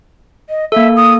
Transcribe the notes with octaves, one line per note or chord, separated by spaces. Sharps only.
D#5
A#3 A4 E5
D#6